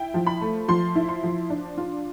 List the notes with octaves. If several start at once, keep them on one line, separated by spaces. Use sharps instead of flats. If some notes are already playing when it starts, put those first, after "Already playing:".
Already playing: E4 G5
F3
B5
A3
F3 C6
E4
C6
F3
D4
F4